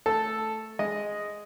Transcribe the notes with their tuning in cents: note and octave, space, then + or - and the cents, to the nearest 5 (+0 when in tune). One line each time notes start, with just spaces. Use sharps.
A3 +0 A4 +0
G#3 +0 D#5 +0